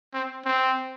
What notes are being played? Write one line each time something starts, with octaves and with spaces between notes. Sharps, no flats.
C4
C4